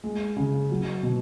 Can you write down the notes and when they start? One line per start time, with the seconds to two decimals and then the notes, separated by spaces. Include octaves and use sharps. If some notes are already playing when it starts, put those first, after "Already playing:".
0.04 G#3
0.37 C#3
0.71 F#3
1.03 B2